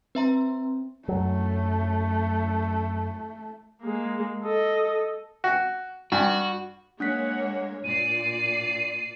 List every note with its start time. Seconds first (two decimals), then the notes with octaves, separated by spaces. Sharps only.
0.15 C4 B4 E5 A#5
1.08 F#2 F#3 A3
3.82 G#3 A#3
4.43 A4 D#5
5.44 F#4
6.12 G2 F#4
7.00 G#3 A#3 D4 C#5 F#5 F#6 B6
7.84 A#2 D5 C7 D#7